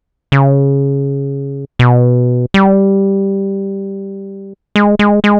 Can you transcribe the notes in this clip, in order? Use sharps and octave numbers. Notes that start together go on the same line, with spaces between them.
C#3
B2
G3
G#3
G#3
G#3